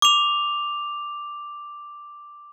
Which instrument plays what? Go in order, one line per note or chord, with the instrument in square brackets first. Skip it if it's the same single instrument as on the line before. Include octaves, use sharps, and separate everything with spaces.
[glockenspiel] D6 F7